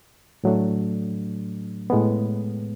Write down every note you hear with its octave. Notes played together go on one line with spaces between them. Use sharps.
A2 F#3 A3 D4
A2 G#3 B3